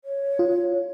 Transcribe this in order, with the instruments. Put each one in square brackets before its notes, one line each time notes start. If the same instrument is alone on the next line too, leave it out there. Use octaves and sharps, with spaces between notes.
[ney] C#5
[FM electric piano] F4